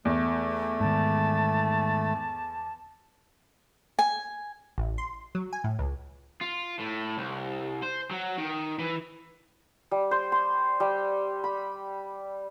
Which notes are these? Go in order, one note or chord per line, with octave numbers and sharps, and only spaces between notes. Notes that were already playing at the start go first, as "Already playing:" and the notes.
E2 A3
G#2 D#3 A5
G#5
A1
C6
F#3
G#5
A2
C#2
F4
A2
C2
C5
F#3
D#3
E3
G3
C5
C6
G3
B5